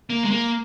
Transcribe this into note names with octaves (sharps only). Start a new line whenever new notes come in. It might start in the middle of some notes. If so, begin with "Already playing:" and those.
A#3
G#3
A#3